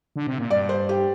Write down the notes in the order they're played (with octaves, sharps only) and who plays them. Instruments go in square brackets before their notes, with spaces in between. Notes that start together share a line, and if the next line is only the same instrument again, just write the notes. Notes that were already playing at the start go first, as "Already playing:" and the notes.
[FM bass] D3
C3
A#2
[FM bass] G2 [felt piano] D5
[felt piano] C5
G4